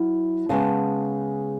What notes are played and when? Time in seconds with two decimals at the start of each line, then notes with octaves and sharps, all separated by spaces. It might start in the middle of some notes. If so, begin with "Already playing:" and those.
Already playing: F#3 E4
0.49 C#3 G#3 B3 A5